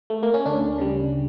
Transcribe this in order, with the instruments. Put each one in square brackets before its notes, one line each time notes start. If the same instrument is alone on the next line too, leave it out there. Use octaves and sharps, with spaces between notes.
[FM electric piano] A3
A#3
C#4
D2 D4
C#3 G3